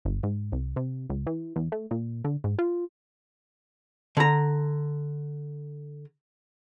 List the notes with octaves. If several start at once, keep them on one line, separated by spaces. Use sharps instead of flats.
G1
G#2
C2
C3
C#2
E3
E2
A3
A#2
D3
G#2
F4
D3 A#5